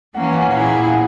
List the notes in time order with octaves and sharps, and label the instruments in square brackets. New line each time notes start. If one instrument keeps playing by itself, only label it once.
[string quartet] E3 A#3 C#4 [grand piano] F#5
[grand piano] G#5
F#5
G#5
[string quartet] A#2 A#3 E4 G#4 [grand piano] F#5
[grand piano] F#5